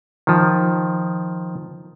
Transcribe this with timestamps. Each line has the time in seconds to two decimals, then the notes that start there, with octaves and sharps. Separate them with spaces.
0.27 D#3 F3